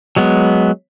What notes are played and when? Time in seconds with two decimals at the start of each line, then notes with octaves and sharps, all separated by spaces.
0.16 F#3 G#3 B3